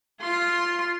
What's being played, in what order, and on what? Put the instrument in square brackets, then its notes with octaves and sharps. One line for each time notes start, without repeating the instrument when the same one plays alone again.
[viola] F4 C6